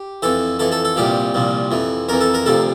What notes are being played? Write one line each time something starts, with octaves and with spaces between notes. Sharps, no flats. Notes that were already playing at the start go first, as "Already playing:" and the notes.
Already playing: G4
F2 E3 A4
F2 E3 A4
A4
A4
C2 A#2 F3 G4
C2 A#2 F3
F2 E3
F2 E3 A#4
A4
A#4
D2 C3 F3 A4